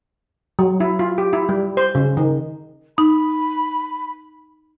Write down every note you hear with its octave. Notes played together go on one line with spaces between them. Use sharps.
F#3
E4
F4
G4
E4
G3
C5
C#3
D#3
D#4 B5